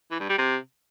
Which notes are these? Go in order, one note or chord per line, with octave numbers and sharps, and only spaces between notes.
E3
G2
G3
C3